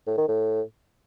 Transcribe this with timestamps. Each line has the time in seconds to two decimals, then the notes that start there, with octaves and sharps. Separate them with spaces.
0.07 A2
0.18 D#3
0.28 A2